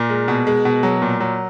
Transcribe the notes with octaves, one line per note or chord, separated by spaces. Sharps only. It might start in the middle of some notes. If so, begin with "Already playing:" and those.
Already playing: A#2 A#4
G#3
B2
G#3
B2
F#3
A#2
F#3